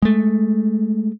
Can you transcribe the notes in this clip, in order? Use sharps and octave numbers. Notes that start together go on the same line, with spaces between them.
G#3 A3